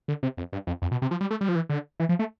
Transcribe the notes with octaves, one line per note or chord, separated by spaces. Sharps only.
D3
C3
F2
G2
F2
F2
B2
C3
F3
G3
A3
G3
F3
E3
D3
E3
F3
A3